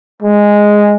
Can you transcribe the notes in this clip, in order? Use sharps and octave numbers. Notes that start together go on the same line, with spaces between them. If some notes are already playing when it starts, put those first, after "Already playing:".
G#3